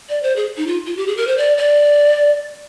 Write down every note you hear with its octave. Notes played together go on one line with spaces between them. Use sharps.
D5
C5
G#4
D#4
F4
F4
G4
G#4
A#4
C5
D5
D5